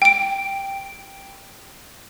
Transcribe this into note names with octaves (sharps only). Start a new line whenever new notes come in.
G5 D7